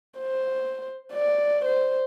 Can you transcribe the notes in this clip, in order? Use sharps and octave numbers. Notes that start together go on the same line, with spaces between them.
C5
D5
C5